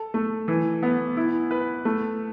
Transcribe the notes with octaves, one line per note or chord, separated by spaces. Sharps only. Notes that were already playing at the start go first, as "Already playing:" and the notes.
Already playing: A4
A3
E3
B3
E4
B4
A3